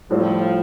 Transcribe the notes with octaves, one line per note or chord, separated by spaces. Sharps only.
A2 F3 G3 C4